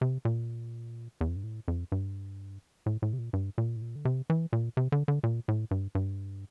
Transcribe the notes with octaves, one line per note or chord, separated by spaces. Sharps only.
C3
A#2
E2
F2
G2
A2
F2
G2
A2
A2
C3
A#2
G2
A#2
A2
A#2
D3
C3
E3
A#2
C3
D3
D3
A#2
A2
G2
G2